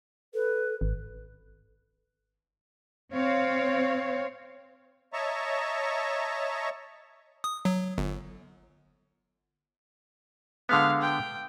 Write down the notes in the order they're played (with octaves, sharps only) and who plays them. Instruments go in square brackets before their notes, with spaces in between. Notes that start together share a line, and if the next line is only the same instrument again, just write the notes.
[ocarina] A4 [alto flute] B4
[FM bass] G#1
[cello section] C4 C#5 F5
[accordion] C#5 D#5 E5 A5 A#5 C#6
[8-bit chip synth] D#6
F#3
G1
[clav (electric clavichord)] D3 G#3 B3 [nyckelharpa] F5
[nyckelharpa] G5